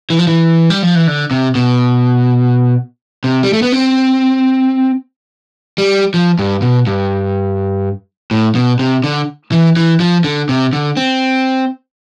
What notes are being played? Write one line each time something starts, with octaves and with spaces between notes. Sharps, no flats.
E3
F3
E3
G3
F3
E3
D3
C3
B2
C3
G3
A3
B3
C4
G3
F3
G2
B2
G2
A2
B2
C3
D3
E3
E3
F3
D3
C3
D3
C4